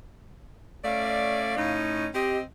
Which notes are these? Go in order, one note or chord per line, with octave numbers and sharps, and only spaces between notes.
A3 C#4 D5 F5
A2 C#4 D#4
C4 G4 D#5